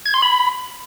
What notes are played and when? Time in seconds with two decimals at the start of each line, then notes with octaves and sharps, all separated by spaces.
0.06 G#6
0.14 C6
0.22 B5